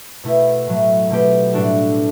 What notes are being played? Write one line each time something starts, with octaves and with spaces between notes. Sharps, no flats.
B2 A3 E4
A2 F#3 A3
B2 A3 C4 G4
A2 G3 D4 F#4 A4